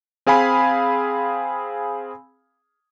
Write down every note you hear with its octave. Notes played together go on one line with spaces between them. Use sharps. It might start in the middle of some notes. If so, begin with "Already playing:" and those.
C4 G#4 F5 G#5 B5